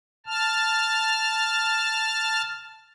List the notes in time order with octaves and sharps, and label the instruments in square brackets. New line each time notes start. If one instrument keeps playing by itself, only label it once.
[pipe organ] A5 F6